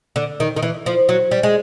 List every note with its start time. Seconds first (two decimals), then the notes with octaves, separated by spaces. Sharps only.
0.16 D3
0.40 D#3
0.56 D#3
0.62 E3
0.86 F3
1.09 F#3
1.31 G3
1.43 G#3